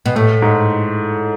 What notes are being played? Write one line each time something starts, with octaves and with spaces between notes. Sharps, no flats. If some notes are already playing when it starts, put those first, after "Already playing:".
B2
A2 A3
G#2